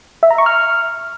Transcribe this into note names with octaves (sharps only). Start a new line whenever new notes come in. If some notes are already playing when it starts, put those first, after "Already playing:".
E5
A#5
C#6
F6